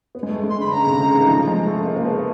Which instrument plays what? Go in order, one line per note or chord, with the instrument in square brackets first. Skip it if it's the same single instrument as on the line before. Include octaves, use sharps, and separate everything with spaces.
[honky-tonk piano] B3
G#3
A3
G#3
[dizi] C6
[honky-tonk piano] D3 [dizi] B5
[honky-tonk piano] C#3 [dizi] A#5
[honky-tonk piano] C3
C#3
D#3
F3
G#3
A3
A#3
A#3
B3